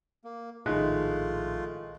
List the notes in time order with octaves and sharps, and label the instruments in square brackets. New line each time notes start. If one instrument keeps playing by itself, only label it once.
[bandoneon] A#3
[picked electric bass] A#1 A2 [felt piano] D#3 F#6 [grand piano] G#3 [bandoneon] A3 F4